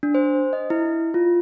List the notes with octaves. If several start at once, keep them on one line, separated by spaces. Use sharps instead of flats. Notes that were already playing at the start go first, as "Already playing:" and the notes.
D4
C5
D#5
E4
F4